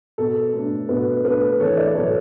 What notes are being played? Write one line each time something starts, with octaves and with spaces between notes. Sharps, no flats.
B2 A4
A3 D4
B2 B4
A3 D4 B4
E2 A4 C#5
B4 D5
B2 F#3 A4 C#5